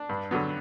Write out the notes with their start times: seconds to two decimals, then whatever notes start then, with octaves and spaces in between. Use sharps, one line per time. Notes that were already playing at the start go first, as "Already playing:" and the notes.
Already playing: D4
0.09 G2
0.31 D3 F#3 B3